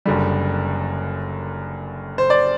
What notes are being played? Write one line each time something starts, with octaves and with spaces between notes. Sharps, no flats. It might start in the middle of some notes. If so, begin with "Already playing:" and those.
F#1 F#2 D3 G3
C5
D5